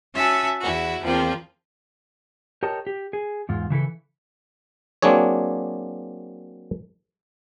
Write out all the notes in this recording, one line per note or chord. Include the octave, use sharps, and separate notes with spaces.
C#4 F#4 E5 G#5 A5
E2 E4 F#4
E2 F3 A#3 C4 F4
G4 A#4 C#5 D#5 A5
G4
G#4
E2 G#2 F4
C#3 E3 E4 A4
F#3 A#3 C4 D4 G#4 C#5